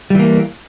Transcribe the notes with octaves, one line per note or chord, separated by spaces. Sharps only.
E3 G3 A#3